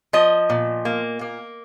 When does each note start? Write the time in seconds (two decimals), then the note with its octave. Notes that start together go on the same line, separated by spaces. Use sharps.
0.13 F3 D#5
0.50 A#2
0.85 A#3
1.21 A#3